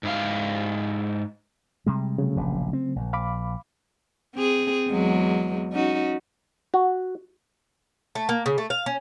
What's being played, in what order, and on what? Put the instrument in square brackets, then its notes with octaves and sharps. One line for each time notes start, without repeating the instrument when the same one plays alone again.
[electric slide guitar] G#2 E4 F5
[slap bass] C3 G3 G#3
[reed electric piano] C#3 F#3 A3
[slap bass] F1 A#1
C4
A#1
[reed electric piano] F5 B5 D6
[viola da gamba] C4 G#4
E2 F#3 G#3
C#4 D#4 F#4
[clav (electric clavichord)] F#4
[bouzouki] A3
A#3
C#3
A3
F5
C#4